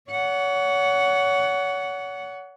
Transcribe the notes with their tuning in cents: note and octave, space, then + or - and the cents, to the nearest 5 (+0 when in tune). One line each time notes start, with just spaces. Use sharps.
C#5 +35 F#5 +0